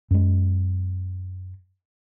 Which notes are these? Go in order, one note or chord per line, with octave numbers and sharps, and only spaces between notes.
F#2 G#3